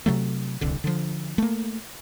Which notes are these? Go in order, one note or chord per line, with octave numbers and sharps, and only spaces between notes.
C3 D#3 F#3 A3
D1 C2 D3
D3 F3
A3 A#3